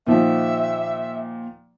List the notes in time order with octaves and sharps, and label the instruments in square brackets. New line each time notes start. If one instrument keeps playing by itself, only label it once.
[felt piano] A#2 D#3 F3 [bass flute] E5